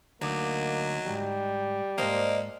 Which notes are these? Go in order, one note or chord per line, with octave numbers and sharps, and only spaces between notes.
D2 D3 F#3 A#3 D#4 D5
D#2 G#2 G3
E2 G#2 A#3 D4 C5 D#5